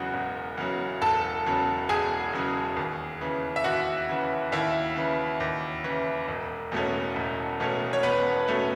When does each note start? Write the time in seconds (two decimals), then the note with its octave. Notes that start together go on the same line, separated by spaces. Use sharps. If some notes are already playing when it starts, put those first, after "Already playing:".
Already playing: E1 E2 C#3 F#3 F#4 F#5
0.14 E1
0.57 E2 C#3 F#3
1.02 E1 A4 A5
1.46 E2 C#3 F#3
1.89 E1 G#4 G#5
2.33 E2 C#3 F#3
2.76 D#2
3.21 C#3 E3
3.56 E5
3.64 D#2 F#4 F#5
4.09 C#3 E3
4.52 D#2 E4 E5
4.96 C#3 E3
5.40 D#2
5.84 C#3 E3
6.28 E1
6.72 E2 B2 A3 C#4
7.16 E1
7.60 E2 B2 A3 C#4
7.93 C#5
8.03 E1 B3 B4
8.48 B2 A3 C#4